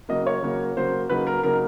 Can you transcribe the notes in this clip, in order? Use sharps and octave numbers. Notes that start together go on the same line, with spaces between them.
C#3 F#3 A#3 D#5
C#5
C#3 F#3 A#3
C#3 F#3 A#3 C5
C#3 F#3 A#3 D#4 B4
A#4
C#3 F#3 A#3 D#4 A#4